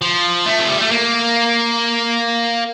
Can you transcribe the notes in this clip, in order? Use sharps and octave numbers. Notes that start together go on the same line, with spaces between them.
F3
A3
F3
G3
A3
A#3